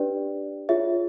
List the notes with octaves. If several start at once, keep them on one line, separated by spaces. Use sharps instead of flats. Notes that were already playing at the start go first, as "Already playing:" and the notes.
Already playing: D4 G4 B4 D5
F4 G#4 C#5 E5